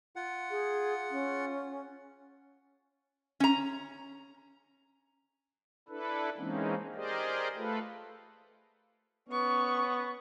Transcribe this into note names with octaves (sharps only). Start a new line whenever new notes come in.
F4 F#5
G#4
C#4
C#4 A#5
D4 E4 A4 B4
E3 G#3 A#3 C4 C#4 D#4
G4 G#4 A#4 C5 D5 D#5
A3 F4 A4 B4
B3 C#4 C#6